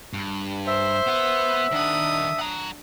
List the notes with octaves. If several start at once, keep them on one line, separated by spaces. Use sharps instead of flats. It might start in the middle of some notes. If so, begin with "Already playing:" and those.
G2
C5 E5
B3 B4
D#3 D4 F#5 D#6
F#5 A#5